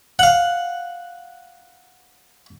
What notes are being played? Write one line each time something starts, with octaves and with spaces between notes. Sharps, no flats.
F5 F#5